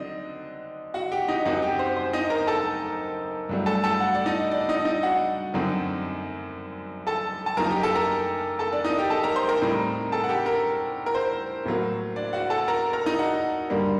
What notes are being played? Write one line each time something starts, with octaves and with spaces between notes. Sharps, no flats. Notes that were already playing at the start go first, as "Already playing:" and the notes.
Already playing: D3 F#3 C4 D4 D#4 D#5
F#4 F#5
G4 G5
D#4 D#5
F#2 F#3 C4 D#4 F#4 F#5
G4 G5
C5
C5
D#4 D#5
A#4 A#5
A4 A5
G2 F#3 A3 D4
A4 A5
A4 A5
F#4 F#5
D5
D#4 D#5
D4 D5
D#4 D#5
D#4 D#5
F#4 F#5
F#2 D3 F#3 C4 D#4
A4 A5
A5
F#2 F#3 A#3 D#4 A#4 A#5
G4 G5
A4 A5
A#4 A#5
A4 A5
D4 D5
D#4 D#5
G4 G5
A4 A5
A#4 A#5
C5 C6
A#4 A#5
A2 G3 C4 D#4
A4 A5
F#5
G4 G5
A#4
A#4
C5
A2 F#3 A#3
D4 D5
F#4 F#5
A4 A5
A#4 A#5
A#4 A#5
D#4 D#5
F#4 F#5
G2 D3 G3 A#3